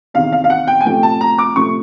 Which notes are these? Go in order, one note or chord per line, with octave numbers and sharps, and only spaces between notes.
E2 C3 D#3 F5
F5
F5
F#5
G5
G#5
C3 F3 A3 G5
A5
A#5
D6
C3 F3 A3 C#6